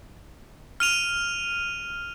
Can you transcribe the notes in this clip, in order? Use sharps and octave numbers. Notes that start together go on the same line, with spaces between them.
F6 D#7 F7